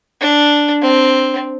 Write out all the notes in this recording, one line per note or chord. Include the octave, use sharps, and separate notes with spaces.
D4
C4